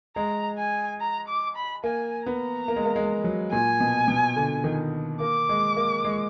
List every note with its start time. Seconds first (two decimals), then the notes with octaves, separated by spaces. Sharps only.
0.16 G#3 A#5
0.58 G#5
1.01 A#5
1.28 D6
1.56 B5
1.84 A#3 G#5
2.26 B3 A#5
2.68 A#3
2.76 G#3
2.85 A#3
2.96 G#3
3.24 F#3
3.52 A#2 G#5
3.81 B2
4.08 B2
4.36 D3
4.64 D#3
5.20 A#3 D6
5.49 G#3
5.77 A#3
6.05 G#3